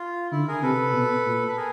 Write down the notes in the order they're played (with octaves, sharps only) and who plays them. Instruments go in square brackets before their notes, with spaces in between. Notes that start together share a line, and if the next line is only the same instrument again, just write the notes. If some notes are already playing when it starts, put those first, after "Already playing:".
Already playing: [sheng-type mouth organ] F4
[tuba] D3 [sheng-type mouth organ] E4
[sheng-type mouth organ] G#4 A#4
[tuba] C3 [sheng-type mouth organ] A4 B4
[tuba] B2
A#2
[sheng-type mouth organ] B4
G#4 A#4